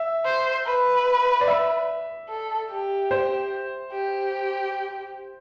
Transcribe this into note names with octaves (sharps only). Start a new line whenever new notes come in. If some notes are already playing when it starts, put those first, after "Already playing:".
Already playing: E5
C5
B4
D5
E5
A4
G4
C5
G4